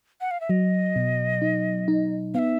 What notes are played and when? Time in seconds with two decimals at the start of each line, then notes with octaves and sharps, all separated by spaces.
0.21 F#5
0.31 F5
0.41 E5
0.49 F#3 D#5
0.96 B2
1.42 D#4
1.88 D#4
2.34 B3 E5 F5